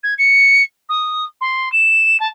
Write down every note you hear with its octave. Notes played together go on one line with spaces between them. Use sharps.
G#6
C#7
D#6
C6
E7
A5